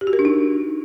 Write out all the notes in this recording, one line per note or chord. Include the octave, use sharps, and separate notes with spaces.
G4
F#4
A#4
D4
D#4